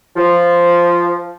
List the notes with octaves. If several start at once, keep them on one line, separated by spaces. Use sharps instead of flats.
F3